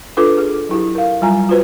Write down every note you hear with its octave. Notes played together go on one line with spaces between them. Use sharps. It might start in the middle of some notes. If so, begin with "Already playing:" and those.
D4 F4 A4 B4 D6
G#4
F#3 E4 G4
A#4 F5
F#3 G3 F4 G#5 A#5
F4 F#4 B4 C5